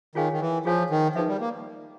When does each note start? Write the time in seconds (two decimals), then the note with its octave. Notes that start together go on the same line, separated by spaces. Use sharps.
0.15 D#3 F4 G#4 C#5 F5 G#5
0.32 D#3
0.41 E3
0.65 F3 F4 G#4 C#5 F5 G#5
0.90 D#3
1.15 F3 D#4 G#4 B4 E5
1.28 G3
1.40 A#3